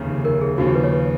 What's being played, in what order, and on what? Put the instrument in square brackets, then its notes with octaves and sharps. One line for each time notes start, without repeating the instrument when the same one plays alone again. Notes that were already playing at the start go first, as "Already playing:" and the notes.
Already playing: [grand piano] F1 D#2 C#3
[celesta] A#4
G#4
[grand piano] D#2 C#3 F3 [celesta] F#4
[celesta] G#4
B4
C#5
B4